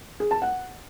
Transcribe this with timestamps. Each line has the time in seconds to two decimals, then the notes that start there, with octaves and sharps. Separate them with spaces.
0.20 G#4
0.31 A5
0.42 F#5